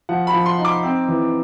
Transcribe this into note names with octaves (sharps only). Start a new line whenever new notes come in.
F3 F#5
B5
F3
C6
D#4
D6
C4
E3